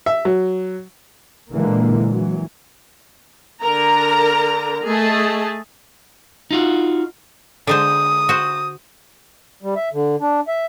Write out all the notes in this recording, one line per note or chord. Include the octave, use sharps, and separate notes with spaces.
E5
F#3
A#2 D3 E3 G#3 A#3
E3 F#3
D3 A#4 A#5
A3 G#4 D#5 A5
D#4 F4 F#4
D3 G#3 C5 D#6
F#4 C5
G3
E5
D3
D4
E5